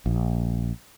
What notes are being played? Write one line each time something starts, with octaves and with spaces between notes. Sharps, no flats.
A#1